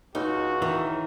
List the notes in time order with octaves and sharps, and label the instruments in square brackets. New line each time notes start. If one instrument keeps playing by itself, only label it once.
[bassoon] C#2 [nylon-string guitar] D#4 [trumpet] F#4
[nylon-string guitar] D#3 [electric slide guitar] E3